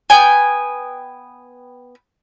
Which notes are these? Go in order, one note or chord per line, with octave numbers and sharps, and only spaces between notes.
B3 G5 G#5